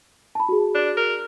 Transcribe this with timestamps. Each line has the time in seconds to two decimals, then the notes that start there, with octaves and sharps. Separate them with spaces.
0.35 A5 B5
0.49 F#4 G#4
0.75 D4
0.97 A#4